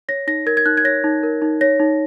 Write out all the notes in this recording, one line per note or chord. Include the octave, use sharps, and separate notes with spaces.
C#5 A#6
D#4 A#6
A#4 G#6
G#6
D#4 F#6
G#6
C#5 A#6
D#4
A#4
D#4
C#5 A#6
D#4